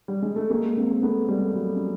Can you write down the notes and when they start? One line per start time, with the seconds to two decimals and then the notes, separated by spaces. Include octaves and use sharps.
0.08 G3
0.22 G#3
0.36 A3
0.50 G#3 A#3
0.77 A#3 C4
1.02 A3 B3
1.29 G3 A3
1.51 A3
1.55 F#3 G#3
1.75 C#4